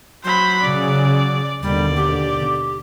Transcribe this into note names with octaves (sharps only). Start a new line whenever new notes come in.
F#3 C5 B5
C#3 D5
D#2 B2 D3 G3 D5
G4